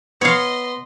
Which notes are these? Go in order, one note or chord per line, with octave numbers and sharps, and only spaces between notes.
B3 C#5 D#5 F5 C6